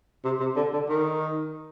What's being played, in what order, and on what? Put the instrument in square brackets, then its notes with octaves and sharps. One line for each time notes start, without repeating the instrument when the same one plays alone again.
[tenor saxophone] C3
C3
D3
D3
D#3